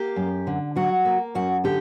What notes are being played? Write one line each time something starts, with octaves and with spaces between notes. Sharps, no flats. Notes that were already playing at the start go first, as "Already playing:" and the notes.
Already playing: A#3 G4
F#2
D3
F#3 F#4
A#3
F#2 F#4
D3 G4